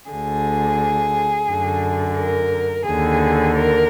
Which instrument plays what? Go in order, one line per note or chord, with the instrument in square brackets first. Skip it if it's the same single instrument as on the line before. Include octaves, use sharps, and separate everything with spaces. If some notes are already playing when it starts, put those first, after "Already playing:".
[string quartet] D2 D3 G#4
F#2 D3
A#4
D#2 D3 G#4
A#4